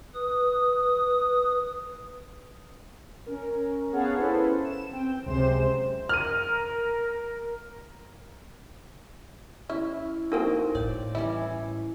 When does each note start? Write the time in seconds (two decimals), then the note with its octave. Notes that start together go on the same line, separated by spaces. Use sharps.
0.14 B4 D#6
3.26 C#4 A#4
3.92 B3 G#4 C#5 F5 F#5 A5
4.15 C#4 E4 A4 B4 C5
4.65 E7
4.92 C4 G5
5.26 C#2 F#2 C3 G#3 C5 E7
6.09 A#4 F6 D#7
9.69 C#4 E4 E5
10.32 F#3 A#3 C4 D#4 A#4
10.75 A2 C#5 D5
11.15 E3 G3 C#4 E4